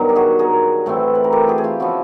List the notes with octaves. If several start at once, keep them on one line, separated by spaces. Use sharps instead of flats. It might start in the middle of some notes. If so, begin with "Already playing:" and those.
Already playing: G2 B2 D#3 F#3
G4
F#4 G#4
G#4 A#4
A2 E3 A3 C4
B4
A#4
G4 A4
F#4 G#4
G#4
F4 G4
C#3 F3 E4 F#4